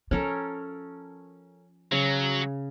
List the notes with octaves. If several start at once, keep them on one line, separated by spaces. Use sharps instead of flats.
F3 C#4 A4 A#4
C#3 F#3